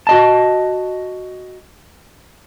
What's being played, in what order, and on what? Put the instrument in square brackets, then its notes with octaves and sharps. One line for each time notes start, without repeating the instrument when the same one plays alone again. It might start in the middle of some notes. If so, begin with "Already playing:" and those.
[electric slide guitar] F#4 D#5 A5